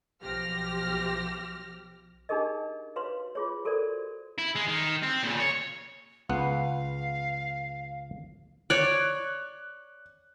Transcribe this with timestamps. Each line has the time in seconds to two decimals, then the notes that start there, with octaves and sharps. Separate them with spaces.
0.22 B1 F3 G4 F6 A#6
2.29 D4 D#4 G4 G#4 A#4 D#5
2.96 F#4 B4 C#5 F5 C6
3.35 F4 G#4 C#5
3.65 F#4 A4 A#4 C5 D5
4.38 E4
4.55 G#3
4.67 D#3
5.03 C4
5.23 A#2 C#3
5.40 C#5
6.29 C#2 B3 F5 F#5
8.70 C#5 D5 F#6